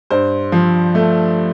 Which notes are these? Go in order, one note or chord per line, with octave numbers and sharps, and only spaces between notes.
G2 C5
F3
A3